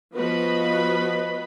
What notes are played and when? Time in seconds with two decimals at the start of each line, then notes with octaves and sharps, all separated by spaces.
0.13 F3 B3 F#4 B4 D#5 B5